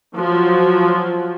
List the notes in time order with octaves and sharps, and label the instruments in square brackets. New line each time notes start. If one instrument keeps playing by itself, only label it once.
[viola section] F3 F#3